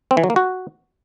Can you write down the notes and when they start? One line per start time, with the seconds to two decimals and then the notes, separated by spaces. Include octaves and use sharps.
0.11 C4
0.17 E3
0.24 F#3
0.30 A#3
0.36 F#4